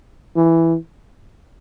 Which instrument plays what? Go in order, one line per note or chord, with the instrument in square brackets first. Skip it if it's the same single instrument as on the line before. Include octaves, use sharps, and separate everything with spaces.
[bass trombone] E3